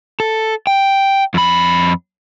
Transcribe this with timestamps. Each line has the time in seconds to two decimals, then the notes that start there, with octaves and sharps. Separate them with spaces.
0.20 A4
0.67 G5
1.34 F2 B5